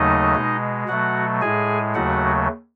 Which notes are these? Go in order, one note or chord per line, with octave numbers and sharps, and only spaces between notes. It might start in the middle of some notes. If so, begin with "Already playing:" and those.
Already playing: D#2 C#3 F#3 A3 D#4 D#5
B2 G#3
B2 F#3 A3 F#4 F#5
A2 G#3 G#4 G#5
D#2 C#3 F#3 A3 F#4 F#5